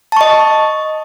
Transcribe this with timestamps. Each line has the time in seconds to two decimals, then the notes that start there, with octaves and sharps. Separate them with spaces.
0.12 A5
0.16 C#6
0.21 D#5